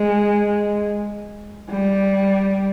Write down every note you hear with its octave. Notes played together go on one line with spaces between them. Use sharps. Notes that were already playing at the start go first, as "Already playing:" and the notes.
Already playing: G#3
G3